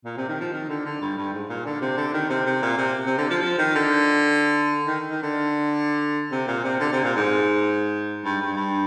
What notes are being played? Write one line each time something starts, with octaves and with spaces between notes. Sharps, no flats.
A#2
C3
D#3
F3
D#3
D3
D3
G2
G2
G#2
A#2
D3
C3
D3
D#3
C3
C3
A#2
C3
C3
D3
F3
F3
D#3
D3
D#3
D#3
D3
C3
A#2
C3
D3
C3
A#2
G#2
G2
G2
G2